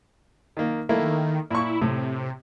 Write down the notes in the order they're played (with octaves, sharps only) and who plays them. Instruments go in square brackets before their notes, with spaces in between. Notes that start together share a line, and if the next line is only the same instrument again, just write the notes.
[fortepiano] D#3 A#3
[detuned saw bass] D#3 [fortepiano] A3 A#3 E4
[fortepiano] A#2 C#6 [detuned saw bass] E4
[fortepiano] A2 [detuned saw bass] C3